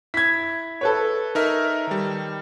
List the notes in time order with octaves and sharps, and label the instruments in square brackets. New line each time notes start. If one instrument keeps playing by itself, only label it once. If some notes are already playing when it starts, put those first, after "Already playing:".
[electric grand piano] E4 [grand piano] G#6 B6
[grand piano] A4 B4 C#5
[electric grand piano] D#4 A#4 E5
D#3 G3